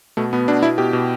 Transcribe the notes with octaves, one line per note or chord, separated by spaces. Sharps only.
B2 A3
B2 B3
B2 D4
B2 E4
B2 G4
B2